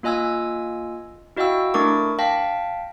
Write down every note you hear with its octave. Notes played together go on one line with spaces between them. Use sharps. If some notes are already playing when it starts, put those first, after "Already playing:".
A#3 F4 D#5 G#5 E6 G#6
E4 F#4 D#5 F5 G5 E6
A3 D4 E4 A#4 C#6 D6
F5 G5 A5 A#6 B6